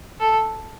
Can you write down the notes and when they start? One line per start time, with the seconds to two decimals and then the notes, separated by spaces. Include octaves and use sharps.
0.20 A4